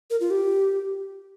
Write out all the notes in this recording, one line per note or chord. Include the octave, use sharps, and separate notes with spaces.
A#4
F4
G4